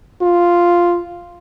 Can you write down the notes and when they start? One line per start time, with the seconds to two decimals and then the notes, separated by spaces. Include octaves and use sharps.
0.22 F4